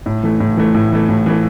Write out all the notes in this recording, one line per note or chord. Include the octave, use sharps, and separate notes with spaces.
A2
E3 A3
A2
E3 A3
A2
E3 A3
A2
E3 A3